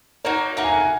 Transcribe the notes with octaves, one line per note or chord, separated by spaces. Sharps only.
A#3 D#4 F#4 C#5
A#3 D#4 F#4 E5
G#5
F#5
G#5